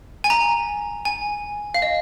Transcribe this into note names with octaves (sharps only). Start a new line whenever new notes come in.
G#5
A#5
G#5
F5
D#5